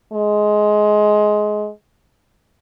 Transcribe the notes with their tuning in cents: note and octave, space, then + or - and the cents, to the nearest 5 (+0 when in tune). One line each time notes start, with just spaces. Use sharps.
G#3 +15